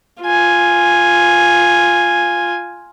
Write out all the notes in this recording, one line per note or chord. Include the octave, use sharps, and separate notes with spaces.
F4 G#5